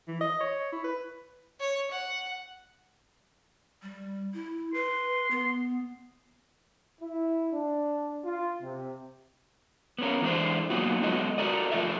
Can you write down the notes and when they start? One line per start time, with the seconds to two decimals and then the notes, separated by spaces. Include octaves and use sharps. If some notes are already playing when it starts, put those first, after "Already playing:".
0.08 E3
0.21 D#5
0.41 C#5
0.73 E4
0.84 B4
1.60 C#5
1.91 F#5
3.82 G3
4.34 E4
4.74 B4 C6
5.31 B3
7.02 E4
7.53 D4
8.25 F4
8.62 C3
9.99 B3 C#4 A#4
10.22 E3 G#3 A3 D4 C5
10.70 F#3 A#3 B3 D#4 F4 F#4
11.02 F#3 G#3 B3 A4 D#5
11.38 F#4 A4 A#4 D5 D#5
11.72 F3 A3 F4 A4 A#4 E5